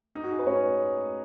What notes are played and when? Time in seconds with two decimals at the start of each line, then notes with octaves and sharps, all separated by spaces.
0.15 D#4
0.23 F#4
0.31 G#4
0.39 B4
0.47 C#4 C#5